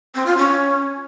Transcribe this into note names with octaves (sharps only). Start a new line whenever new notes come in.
C4
F4
C#4